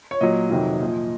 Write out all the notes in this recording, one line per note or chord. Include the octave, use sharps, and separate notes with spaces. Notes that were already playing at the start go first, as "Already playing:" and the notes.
C#5
A#2 F#3 D#5
F2 C3 D#3 F#3
A#2 F3